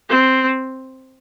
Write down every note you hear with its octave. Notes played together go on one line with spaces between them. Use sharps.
C4